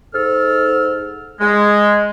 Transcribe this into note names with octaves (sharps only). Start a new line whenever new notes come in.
G#2 A4 F6
G#3